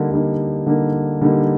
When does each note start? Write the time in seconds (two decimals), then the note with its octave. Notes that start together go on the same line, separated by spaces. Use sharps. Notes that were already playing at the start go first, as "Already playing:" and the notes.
Already playing: D3 G3 A#3 D#4
0.11 D3 G3 A#3 D#4
0.66 D3 G3 A#3 D#4
1.21 D3 G3 A#3 D#4